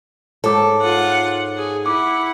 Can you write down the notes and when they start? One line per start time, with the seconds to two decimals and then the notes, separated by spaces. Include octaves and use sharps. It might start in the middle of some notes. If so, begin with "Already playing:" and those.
0.44 G#2 A4 C#5 D6
0.81 F4 F#5
1.57 G#4
1.86 E4 F#5 D6